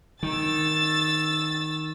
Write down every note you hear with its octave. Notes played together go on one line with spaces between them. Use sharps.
D#3 E6 A6